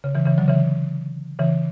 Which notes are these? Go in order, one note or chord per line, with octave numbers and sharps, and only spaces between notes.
C#3
C#3 E3
C#3 E3
D3 F#3
C#3 E3
C#3 E3